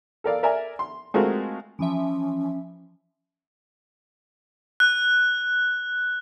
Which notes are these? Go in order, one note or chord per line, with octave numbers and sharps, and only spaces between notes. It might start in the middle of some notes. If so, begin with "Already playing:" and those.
A4 A#4 D5 F5
A#4 D5 E5 G#5 A#5
C6
G#3 A3 C4 F4 F#4 A#4
E3 F3 C#4 E5
F#6